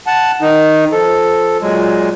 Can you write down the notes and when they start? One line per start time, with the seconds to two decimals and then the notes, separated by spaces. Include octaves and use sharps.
0.07 F#5 A5
0.41 D#3 D#4
0.92 F3 A4
1.61 A#2 F#3 G#3